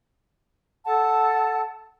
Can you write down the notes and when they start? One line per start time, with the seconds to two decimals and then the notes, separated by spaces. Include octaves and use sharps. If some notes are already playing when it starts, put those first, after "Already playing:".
0.84 A4 F#5 A5